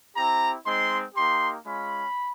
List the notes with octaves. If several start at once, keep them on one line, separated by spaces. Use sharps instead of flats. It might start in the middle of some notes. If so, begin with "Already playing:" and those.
C4 E4 G4 A#5
G#3 C4 D#4 C6
A#3 D#4 G4 C6
G#3 C#4 F4 B5